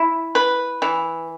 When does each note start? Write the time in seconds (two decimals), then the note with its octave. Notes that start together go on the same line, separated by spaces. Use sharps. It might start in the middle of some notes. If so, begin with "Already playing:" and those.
Already playing: E4
0.35 B4
0.82 E3